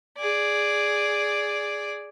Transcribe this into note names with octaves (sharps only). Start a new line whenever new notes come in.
G#4 D5